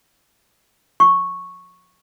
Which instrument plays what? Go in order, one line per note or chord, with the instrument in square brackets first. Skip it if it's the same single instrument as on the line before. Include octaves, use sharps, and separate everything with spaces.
[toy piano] C#6